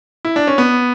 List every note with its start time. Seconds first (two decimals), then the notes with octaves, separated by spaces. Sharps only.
0.25 E4
0.36 D4
0.47 C#4
0.58 B3